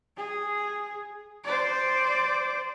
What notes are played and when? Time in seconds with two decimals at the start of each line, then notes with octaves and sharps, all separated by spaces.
0.17 G#4
1.44 C5 D5